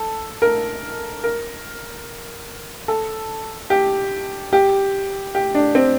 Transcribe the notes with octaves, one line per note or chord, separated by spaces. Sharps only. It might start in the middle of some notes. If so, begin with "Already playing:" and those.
Already playing: A4
A#4
A#4
A4
G4
G4
G4
D4
C4